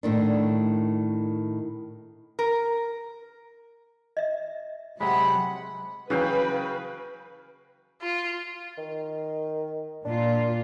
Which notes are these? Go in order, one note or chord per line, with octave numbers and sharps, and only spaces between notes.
A2 D#3 D4
A#4
D#5 E5
C3 F#3 G#3 F#5 B5
C#3 E3 F#3 F#4 B4 F5 G5
F4
D#3
A#2 D4 F4